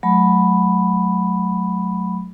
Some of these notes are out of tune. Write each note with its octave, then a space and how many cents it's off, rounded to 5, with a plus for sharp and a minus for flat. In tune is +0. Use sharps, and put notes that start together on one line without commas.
F#3 -10 A3 -25 B5 +0